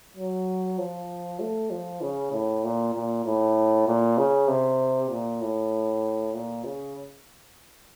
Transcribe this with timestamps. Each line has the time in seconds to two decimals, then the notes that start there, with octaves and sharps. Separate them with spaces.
0.17 F#3
0.78 F3
1.40 A3
1.71 F3
2.01 C#3
2.32 A2
2.64 A#2
2.94 A#2
3.25 A2
3.87 A#2
4.17 C#3
4.48 C3
5.10 A#2
5.41 A2
6.34 A#2
6.64 C#3